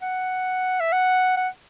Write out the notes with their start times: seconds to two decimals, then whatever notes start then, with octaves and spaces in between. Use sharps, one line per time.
0.02 F#5
0.80 E5
0.92 F#5
1.37 F#5